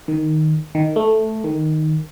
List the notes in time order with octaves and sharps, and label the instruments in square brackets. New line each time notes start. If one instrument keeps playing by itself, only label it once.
[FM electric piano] D#3
D#3
A3
D#3